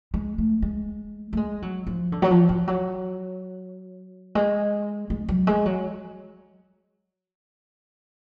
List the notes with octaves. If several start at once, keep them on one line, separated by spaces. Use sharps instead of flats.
G#3
A3
G#3
A3
G#3
F#3
F3
D3
F#3
F3
F3
F#3
G#3
G#3
F#3
G#3
F#3